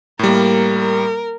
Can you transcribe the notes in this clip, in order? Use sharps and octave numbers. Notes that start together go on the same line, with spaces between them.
A2 G3 A#3 A#4
A#4